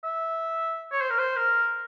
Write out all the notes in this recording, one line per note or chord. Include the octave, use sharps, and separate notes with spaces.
E5
C#5
C5
A#4
C5
A#4